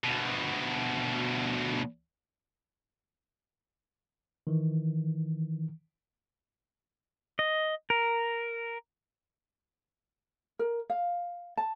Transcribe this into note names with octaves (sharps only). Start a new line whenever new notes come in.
D2 B2
D#3 E3
D#5
A#4
A#4
F5
A5